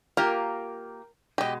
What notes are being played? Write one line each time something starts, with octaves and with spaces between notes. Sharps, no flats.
A#3 F4 G4 A#4
B2 G#3 G4 D#5